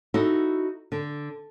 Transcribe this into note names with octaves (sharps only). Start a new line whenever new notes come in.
D#4 E4 F#4 A4 D#5
D3